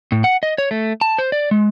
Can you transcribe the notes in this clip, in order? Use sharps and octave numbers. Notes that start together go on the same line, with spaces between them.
A2
F#5
D#5
C#5
A3
A5
C5
D5
G#3